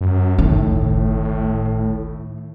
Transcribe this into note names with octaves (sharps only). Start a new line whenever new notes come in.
F#2
G1 C#2 A2 D#3